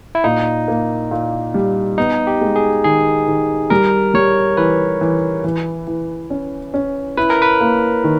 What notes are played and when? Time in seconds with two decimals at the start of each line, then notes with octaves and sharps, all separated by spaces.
0.15 E4
0.24 A#2 D#4
0.68 A#3
1.11 A#2
1.54 G3
1.98 B3 D#4
2.27 G4
2.41 G#3
2.56 G#4
2.84 D#3 G#4
3.28 D#3
3.70 G3 A#4
4.14 G3 C#5
4.57 E3 B4
5.01 E3
5.44 E3
5.87 E3
6.30 C#4
6.74 C#4
7.17 E4 B4
7.30 A#4
7.42 B4
7.61 A#3
8.04 D#3